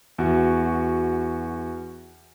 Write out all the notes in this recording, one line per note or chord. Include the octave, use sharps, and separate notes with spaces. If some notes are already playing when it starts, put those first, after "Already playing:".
E2 F#4